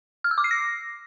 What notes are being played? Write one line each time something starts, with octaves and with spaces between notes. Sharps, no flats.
F6
E6
D6
C7
A#6